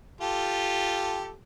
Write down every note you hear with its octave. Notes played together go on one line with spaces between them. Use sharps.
F4 G4 A4